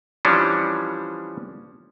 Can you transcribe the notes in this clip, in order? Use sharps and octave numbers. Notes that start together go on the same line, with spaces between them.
E3 F3 G3 C#4 D4